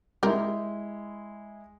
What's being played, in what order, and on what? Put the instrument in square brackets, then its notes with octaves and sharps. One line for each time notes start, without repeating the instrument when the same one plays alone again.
[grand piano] G#3 E4 [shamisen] G4 A#4